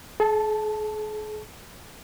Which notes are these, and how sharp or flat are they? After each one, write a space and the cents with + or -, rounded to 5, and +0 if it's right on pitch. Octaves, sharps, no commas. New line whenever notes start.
G#4 +45 A5 +0